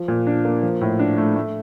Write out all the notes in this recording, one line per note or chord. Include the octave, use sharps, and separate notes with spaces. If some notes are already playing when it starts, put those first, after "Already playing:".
Already playing: F3
A#2
D4
A#3
F3
A2
D4
A3
A3